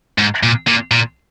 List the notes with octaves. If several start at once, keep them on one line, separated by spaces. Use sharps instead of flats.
G#2
A#2
A#2
A#2